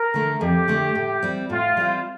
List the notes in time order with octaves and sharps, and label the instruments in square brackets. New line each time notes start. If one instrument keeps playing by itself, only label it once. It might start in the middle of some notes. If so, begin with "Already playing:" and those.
Already playing: [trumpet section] A#4
[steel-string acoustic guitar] D3 A3
[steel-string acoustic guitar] F2 [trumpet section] G4
[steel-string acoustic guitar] D3 A3
A2
G3 C4
[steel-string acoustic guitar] A2 [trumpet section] F4
[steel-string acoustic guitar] G3 C4